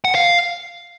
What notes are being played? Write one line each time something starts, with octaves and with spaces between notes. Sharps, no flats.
F#5
F5